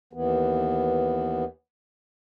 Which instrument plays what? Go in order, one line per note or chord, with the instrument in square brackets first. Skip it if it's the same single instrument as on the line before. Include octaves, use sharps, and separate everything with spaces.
[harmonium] D#2 E3 B3